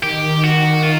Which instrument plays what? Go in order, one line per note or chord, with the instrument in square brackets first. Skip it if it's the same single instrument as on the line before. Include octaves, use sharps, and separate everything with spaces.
[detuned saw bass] D#3 [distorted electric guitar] G4
[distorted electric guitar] F#4
F4